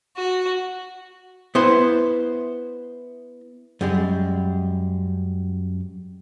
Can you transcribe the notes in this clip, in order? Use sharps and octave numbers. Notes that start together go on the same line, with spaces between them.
F#4
B3 E4 C5
F#2 G3 G#3